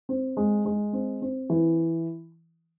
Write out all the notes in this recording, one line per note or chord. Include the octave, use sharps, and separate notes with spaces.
C4
G#3
G#3
C4
C4
E3